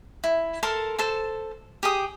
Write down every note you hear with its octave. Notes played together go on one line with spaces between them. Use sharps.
E4
A4 A#4 A5 C6
A4 C5 A5
G4 G#4 D#6